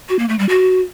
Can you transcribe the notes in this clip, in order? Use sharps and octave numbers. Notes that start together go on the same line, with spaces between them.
F#4
A#3
A3
G3
F#4